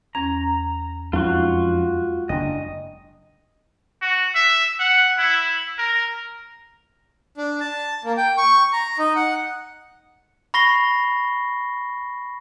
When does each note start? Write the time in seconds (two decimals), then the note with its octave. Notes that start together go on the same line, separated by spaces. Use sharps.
0.15 E2 C#4 A#5 G#6
1.13 F2 F#3 G#3 C#4 D#4 F4 F#4
2.29 F#1 D4 D#5 G5 G#5
4.01 F#4
4.35 E5
4.79 F#5
5.18 E4
5.78 A#4
7.38 D4
7.60 A5
8.04 A#3
8.17 G5
8.38 C#6
8.73 A#5
8.99 D#4
9.16 F#5
10.54 B5 C#6 A#6 C7 G7